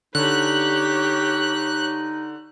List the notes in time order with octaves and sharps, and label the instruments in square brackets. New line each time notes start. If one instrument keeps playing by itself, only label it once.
[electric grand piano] D3 [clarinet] D#4 [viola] G4 C#5 [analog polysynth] F#6